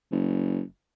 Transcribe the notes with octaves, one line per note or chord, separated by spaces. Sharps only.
F#1